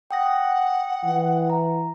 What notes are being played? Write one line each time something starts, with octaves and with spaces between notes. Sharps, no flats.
F#5 G5 D#6 A#6
E3
A#5